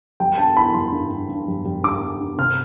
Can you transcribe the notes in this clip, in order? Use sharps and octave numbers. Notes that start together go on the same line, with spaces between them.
G3 G5
G2 A5
E3 B5
G3 C6
G2
G2
G2
G3
G3
G2 D6
G2
G2
C3 F6